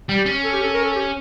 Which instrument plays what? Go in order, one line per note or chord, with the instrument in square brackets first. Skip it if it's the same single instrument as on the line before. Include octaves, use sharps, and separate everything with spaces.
[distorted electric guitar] G3
[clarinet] G4
[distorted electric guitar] C#4
[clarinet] A4
G4
A4
A#4
A4
G4